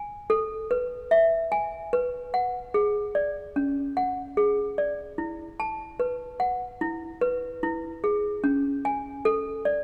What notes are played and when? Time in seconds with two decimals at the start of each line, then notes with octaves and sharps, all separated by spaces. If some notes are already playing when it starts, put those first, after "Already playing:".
Already playing: G#5
0.30 A4
0.71 B4
1.11 E5
1.52 G#5
1.93 B4
2.34 F#5
2.74 G#4
3.15 D5
3.56 C#4
3.97 F#5
4.37 G#4
4.78 D5
5.18 E4
5.60 A5
6.00 B4
6.40 F#5
6.81 E4
7.21 B4
7.63 E4
8.04 G#4
8.44 C#4
8.85 G#5
9.25 A4
9.65 D5